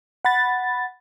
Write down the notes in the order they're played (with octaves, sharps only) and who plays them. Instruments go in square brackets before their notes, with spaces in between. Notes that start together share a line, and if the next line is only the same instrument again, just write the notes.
[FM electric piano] F#5 B5 A6